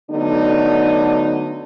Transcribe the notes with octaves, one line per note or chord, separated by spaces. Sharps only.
D3 F#3 A3 B3 D4 D#4